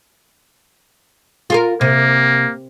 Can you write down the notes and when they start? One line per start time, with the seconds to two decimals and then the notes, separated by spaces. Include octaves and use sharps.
1.50 F4 G#4 A#4
1.81 C3 A#3